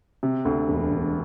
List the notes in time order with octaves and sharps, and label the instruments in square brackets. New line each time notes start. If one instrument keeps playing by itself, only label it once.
[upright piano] C3
D2
E1
E1